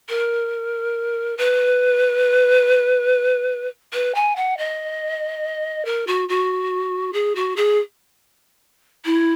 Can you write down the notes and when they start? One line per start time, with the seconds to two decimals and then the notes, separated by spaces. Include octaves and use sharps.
0.09 A#4
1.37 B4
3.93 B4
4.14 G#5
4.36 F#5
4.58 D#5
5.85 A#4
6.07 F#4
6.29 F#4
7.13 G#4
7.35 F#4
7.56 G#4
9.05 E4